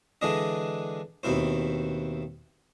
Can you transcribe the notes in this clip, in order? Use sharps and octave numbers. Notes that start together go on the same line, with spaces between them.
D3 E3 G#3 D4 D#5
D#2 B2 C4 E4 C5